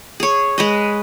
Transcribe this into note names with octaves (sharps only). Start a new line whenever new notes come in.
G#4 C#5
G#3 B4 D#5